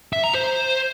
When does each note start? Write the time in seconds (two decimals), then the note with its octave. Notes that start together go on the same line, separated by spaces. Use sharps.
0.13 E5
0.24 A#5
0.34 C5